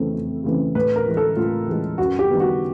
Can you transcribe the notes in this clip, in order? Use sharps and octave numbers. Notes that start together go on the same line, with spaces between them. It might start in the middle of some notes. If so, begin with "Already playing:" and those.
Already playing: F2 C#3 E3 A3 C4
F2
C#3 E3 A3 C4
A2 B4
A#4
E3 G#3
A4
A2 F4
E3 G#3
F#2 F#4
G4
D#3 G3 B3
F#4